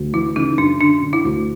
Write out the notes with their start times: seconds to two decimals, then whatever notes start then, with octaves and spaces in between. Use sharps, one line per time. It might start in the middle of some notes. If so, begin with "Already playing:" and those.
Already playing: D2
0.13 E3 E4
0.36 C#3 D#4
0.58 F#2 D4
0.80 D3 D4
1.02 D3
1.13 E4
1.25 D2